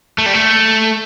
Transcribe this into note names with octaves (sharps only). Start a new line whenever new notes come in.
A3
G3
A3